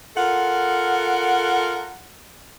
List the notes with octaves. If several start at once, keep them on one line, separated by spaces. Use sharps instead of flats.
F4 A4 A#4 F#5